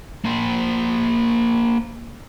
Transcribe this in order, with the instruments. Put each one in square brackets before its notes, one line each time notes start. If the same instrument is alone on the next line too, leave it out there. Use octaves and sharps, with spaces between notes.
[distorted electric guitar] A#3 C5